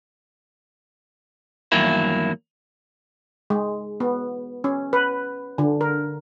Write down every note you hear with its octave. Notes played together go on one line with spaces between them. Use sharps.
E2 G2 D#3 F#3 A#3 E4
G#3
B3
C#4
B4
D3
A#4